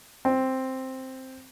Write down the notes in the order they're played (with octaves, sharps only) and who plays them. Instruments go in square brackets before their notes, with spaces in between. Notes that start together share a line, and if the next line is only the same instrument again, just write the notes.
[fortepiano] C4